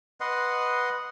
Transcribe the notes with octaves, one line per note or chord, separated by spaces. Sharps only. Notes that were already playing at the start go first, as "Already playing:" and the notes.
B4 D#5 F#5 C6